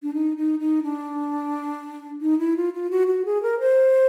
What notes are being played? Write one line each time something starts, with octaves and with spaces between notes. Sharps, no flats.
D4
D#4
D#4
D#4
D4
D#4
E4
F4
F4
F#4
F#4
G#4
A#4
C5